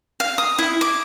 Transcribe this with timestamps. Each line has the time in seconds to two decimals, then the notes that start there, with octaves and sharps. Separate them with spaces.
0.20 F5
0.38 D#6
0.58 E4
0.81 D6